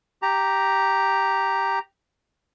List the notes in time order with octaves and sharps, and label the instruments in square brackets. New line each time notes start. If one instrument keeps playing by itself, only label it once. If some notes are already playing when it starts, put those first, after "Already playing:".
[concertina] G4 A#5